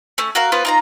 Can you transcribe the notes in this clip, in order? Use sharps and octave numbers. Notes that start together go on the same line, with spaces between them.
A3 C#4
F#4 A#4 F5
B3 F4 B4 C5
D#4 F4 A#5